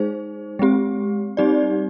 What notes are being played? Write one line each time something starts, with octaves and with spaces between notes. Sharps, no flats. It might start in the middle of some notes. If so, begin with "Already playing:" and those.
Already playing: G#3 D#4 G#4 C5
G#3 C4 G4
G3 C4 D#4 G4 D5